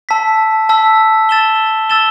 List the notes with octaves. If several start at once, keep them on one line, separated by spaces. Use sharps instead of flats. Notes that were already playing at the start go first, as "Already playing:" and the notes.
A5 E6 B6
A5 E6 B6
E6 A6 E7 G7
E6 A6 E7 G7